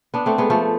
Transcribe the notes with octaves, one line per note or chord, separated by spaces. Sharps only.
B3 D4
A3 C4
G#3 B3
F3 A3